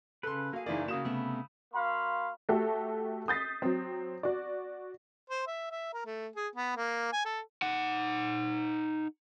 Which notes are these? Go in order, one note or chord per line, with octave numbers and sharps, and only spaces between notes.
C#3 A4 B4 C6
A#3 F#4 G#4 F5
F#1 E3 D#4 E4 A#4 D5
C#3 A#3 F#4 D#6 E7
C3 A3 B3 B5 E6
A#3 F#4 F5 B5 C6
A3 F#4 G4 A4
D#6 G6 A6 B6 C7
F#3 C4
F#4 D5
C5
E5
E5
A#4
A3
G#4
B3
A#3
G#5
A4
D#4 F#5